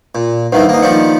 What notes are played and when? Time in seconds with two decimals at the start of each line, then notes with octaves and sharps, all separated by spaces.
0.15 A#2
0.52 G2 D#3 E3 B4 C5 F#5
0.69 A#3 D#4
0.82 D#3 F3 A#3 D4 F5 C#7